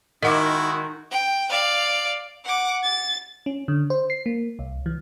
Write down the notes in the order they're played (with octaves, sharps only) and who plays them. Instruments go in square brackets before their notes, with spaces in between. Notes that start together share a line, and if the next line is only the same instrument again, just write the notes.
[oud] D#3 [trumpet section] G#3 E4 F#4 [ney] D#4 [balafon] D#5 F#5 D6
[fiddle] G5
D5 F5
[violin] F#5 D6
A6
[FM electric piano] C#4
D3
C5
C7
A#3
C2
E3